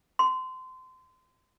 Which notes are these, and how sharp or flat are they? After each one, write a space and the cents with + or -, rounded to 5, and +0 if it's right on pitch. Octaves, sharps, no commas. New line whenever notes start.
C6 -25